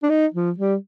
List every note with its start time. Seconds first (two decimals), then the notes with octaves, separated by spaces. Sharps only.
0.03 D4
0.09 D#4
0.34 F3
0.58 G3